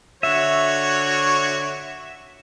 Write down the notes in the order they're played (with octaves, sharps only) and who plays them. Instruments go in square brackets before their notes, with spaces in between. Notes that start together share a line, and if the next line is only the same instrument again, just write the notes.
[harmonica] D3 F#4 C#5 [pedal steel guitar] E5